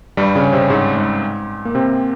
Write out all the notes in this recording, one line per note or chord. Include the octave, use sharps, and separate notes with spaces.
G2 G3
C#3 C#4
C3 C4
G#2 G#3
G#2 G#3
A#3
C3 C4